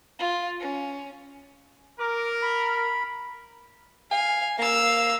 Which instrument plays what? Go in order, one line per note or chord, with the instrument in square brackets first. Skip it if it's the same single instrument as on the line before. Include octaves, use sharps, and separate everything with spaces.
[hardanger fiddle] F4
C#4
[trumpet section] A#4 [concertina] D6
[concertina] B5
[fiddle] F5 [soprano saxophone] G#5
[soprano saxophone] A#3 [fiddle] F5 E6